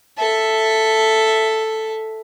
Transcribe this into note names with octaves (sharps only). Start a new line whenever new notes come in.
A4 E5